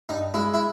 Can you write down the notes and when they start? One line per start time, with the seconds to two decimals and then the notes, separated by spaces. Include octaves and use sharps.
0.09 G2 D#4
0.34 G#3 E4
0.54 E4